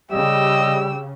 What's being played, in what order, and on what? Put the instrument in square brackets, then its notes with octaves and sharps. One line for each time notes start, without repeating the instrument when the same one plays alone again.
[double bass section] C#3 [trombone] G3 [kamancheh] G4 E6 [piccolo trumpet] D#5